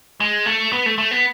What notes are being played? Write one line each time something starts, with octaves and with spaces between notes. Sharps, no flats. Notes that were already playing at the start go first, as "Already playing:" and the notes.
G#3
A3
B3
A3
A3
B3